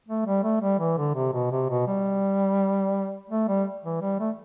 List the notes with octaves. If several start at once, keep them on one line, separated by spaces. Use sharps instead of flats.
A3
G3
A3
G3
E3
D3
C3
B2
C3
B2
G3
A3
G3
E3
G3
A3